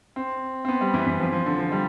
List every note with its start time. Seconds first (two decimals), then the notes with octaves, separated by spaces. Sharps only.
0.16 C4
0.65 C4
0.68 B3
0.81 G3
0.94 E3
1.06 E3
1.20 F3
1.32 F3
1.46 D3
1.59 F3
1.72 G3